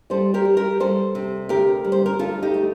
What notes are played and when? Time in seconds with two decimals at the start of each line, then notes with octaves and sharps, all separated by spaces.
0.10 G3 A4 C5
0.34 G4 A#4
0.45 G3
0.57 G4 A#4
0.80 G3 A4 C5
1.15 C3
1.49 D2 G4 A#4
1.84 G3
1.92 C5
2.06 A#4
2.19 D2 F4 A4
2.42 D#4 G4
2.54 A3